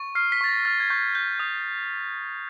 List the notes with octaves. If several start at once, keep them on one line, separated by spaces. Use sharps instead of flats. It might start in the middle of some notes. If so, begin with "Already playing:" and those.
Already playing: C#6
F6 C7
B6
C#6 A6
A#6
F6 A6
G#6
C#6 G6
G6
D#6